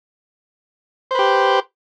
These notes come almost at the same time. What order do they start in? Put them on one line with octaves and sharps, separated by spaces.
C5 B4 G4